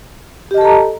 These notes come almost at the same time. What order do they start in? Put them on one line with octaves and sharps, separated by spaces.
G4 D#5 A5 A4 A#5